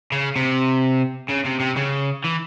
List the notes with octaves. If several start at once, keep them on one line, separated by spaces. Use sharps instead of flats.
C#3
C3
C#3
C3
C3
C#3
E3